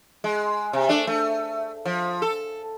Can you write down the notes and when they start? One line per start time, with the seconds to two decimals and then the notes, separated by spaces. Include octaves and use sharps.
0.24 G#3
0.73 C3
0.89 A3 D4
1.07 A3
1.85 F3
2.22 A4